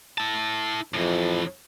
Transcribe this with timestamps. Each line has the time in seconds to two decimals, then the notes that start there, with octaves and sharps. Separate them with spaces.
0.18 E4 A5
0.94 F2 A2 E3